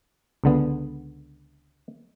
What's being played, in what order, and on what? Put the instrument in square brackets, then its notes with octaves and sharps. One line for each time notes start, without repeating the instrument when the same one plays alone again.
[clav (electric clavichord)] C#2 D3 B3